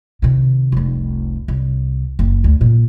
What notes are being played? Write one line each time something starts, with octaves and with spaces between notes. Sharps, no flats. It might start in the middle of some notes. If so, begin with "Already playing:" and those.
C3 D#3
F1 C2
C2
F#1
D2
A#2 C#3